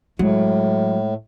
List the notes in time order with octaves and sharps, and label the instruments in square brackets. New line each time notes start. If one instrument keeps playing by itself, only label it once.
[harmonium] A2 [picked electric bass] F#3 [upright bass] G#3